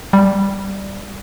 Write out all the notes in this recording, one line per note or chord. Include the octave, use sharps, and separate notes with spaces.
G3